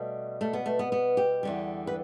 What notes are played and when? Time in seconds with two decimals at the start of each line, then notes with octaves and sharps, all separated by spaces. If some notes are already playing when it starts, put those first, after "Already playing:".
Already playing: B2 G3 A3
0.41 A3
0.53 B3
0.66 A3
0.79 B3
0.92 B3
1.17 G4
1.43 E2 D3 G3
1.87 B4